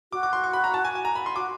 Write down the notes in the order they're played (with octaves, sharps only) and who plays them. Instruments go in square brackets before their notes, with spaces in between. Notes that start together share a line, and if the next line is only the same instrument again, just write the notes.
[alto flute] F#4 [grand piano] D6
[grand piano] D6
C6
C#6
B5
A#5
A5
G#5
G#5
A#5
B5
C6
[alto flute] F#4 [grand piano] D6